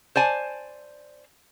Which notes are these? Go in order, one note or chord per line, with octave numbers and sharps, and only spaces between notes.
C5 D5 G#5 A5